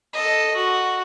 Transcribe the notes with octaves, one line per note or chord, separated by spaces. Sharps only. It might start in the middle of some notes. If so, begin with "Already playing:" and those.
A4 D#5
F#4